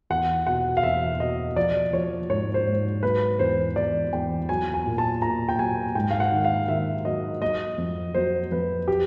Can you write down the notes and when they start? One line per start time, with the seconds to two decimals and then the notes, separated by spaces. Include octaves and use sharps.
0.10 E2 F#5
0.47 B2 F#5
0.77 F5
0.83 E2 E5
1.20 B2 D#5
1.56 F3 D5
1.93 F3 C#5
2.30 G#2 C#5
2.54 C5
2.66 G#2
3.03 F#3 B4
3.39 E2 C5
3.76 E2 D5
4.13 E2 G5
4.49 F#3 G#5
4.74 G#5
4.86 A#2
4.98 A5
5.22 A#2 A#5
5.49 G5
5.58 F#3 G#5
5.95 G#2 G5
6.11 F5
6.20 F#5
6.32 D#3
6.45 F5
6.68 D#3 E5
7.05 F#3 D#5
7.42 F#3 D#5
7.78 F2
8.14 F#3 C5
8.52 F2 B4
8.88 G4